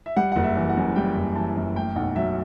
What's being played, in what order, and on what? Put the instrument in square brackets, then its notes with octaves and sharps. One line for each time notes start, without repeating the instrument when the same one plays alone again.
[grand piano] E5
G3 F#5
F#1 F#5
E5
E3
F#5
F#2
G3 G5
F#1
E3 A5
F#2
A3 G5
B1 F#5
F#3 E5